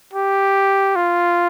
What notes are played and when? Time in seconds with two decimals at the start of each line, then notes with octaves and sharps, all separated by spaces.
0.13 G4
0.96 F4